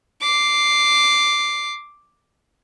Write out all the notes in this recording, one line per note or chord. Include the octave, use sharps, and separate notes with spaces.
D6 C7